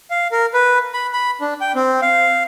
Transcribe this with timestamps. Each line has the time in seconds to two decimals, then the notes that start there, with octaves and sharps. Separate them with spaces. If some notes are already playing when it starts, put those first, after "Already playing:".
0.10 F5
0.32 A#4
0.54 B4
0.93 B5
1.13 B5
1.41 D4
1.61 G5
1.75 C4
2.02 F5